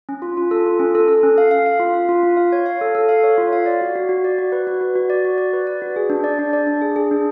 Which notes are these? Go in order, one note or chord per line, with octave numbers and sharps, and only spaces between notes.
C#4
F4
F4
A4
F4
C#4
A4
A4
C#4
F5
F5
F5
F4
F5
F4
F4
F5
C#5
F5
A4
A4
F5
C#5
F4
F5
D5
F#4
F#4
F#4
D5
F#4
B4
F#4
F#4
F#4
D5
F#4
D5
B4
D5
F#4
G#4
D4
D5
D4
D5
D4
G#4
G#4
D4